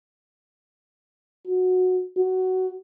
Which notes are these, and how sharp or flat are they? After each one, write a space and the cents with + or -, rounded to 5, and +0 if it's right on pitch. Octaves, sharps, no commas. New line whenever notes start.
F#4 -10
F#4 +10